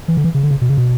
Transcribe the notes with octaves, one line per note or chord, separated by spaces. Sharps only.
E3
D3
E3
C#3
D3
C#3
B2
C#3
B2